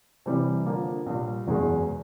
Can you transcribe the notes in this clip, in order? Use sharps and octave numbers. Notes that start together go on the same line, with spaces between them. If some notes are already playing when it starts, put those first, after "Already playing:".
C3 E3 G3
D3 F3 A#3
A#1 A#2 G3
F#1 E2 B2 G#3